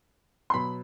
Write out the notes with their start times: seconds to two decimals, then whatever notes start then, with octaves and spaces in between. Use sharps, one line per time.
0.50 C6
0.54 B2 F#3 B5